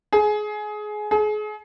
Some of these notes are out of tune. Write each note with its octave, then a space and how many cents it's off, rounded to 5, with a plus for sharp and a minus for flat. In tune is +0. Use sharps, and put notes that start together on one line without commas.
G#4 +20
G#4 +35